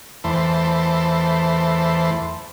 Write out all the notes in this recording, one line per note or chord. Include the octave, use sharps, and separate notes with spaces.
E2 E3 A3 C5